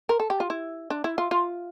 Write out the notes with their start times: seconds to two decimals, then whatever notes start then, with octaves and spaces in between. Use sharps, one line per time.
0.09 A#4
0.20 A4
0.30 G4
0.40 F4
0.50 E4
0.90 D4
1.04 E4
1.18 F4
1.31 F4